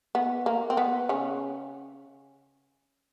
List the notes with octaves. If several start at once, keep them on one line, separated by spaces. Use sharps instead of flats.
B3
A#3
C4
B3
C#3 C#4